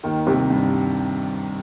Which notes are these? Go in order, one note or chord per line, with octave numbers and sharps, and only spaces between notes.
D#2 D#3
C2 C3
G2